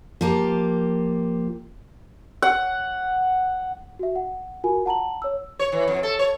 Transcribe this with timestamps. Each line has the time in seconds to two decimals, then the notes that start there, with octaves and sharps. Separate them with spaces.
0.21 F3 A#3 G4
2.42 F#5
3.99 F#4 E5
4.16 F#5
4.64 F4 F#4 A#4 G#5
4.86 F#5 A5 A#5 F#7
5.22 C#5 E6
5.59 C#5
5.72 E3
5.88 F2
6.03 A4
6.19 C#5